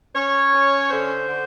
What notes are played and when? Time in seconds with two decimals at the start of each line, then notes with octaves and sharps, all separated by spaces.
0.15 C#4 C#5
0.53 C#4
0.90 D3 C5
1.28 D3